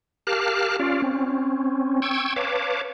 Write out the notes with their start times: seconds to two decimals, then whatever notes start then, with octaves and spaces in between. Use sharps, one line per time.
0.27 G4 A#4 F5 A5 F6 F#6
0.80 C#4 F4 D5 F5
1.02 C4 C#4
2.02 G5 C#6 E6 G#6
2.36 B4 C#5 F5 A5 D6